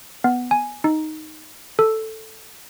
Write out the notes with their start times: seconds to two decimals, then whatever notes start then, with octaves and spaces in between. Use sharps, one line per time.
0.24 B3
0.51 G#5
0.84 D#4
1.79 A4